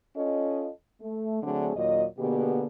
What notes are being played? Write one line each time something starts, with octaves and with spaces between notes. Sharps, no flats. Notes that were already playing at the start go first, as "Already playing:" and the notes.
C#4 F4 A4 D#5
A3
D3 F#3 A3 C4 D4 G#4
D#2 A#2 F#3 D#5
B2 D3 A#3 B3 G4 G#4